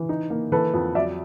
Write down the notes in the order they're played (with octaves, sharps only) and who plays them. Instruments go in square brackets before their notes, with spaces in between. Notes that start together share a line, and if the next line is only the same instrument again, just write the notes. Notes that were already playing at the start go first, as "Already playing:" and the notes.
Already playing: [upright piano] E3
D#4
A#3
E3 A4 B4
F2
F#3 D5 E5